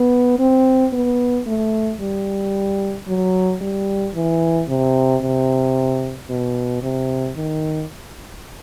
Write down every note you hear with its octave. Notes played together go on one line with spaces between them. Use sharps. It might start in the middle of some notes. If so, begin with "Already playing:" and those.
Already playing: B3
C4
B3
A3
G3
F#3
G3
E3
C3
C3
B2
C3
D#3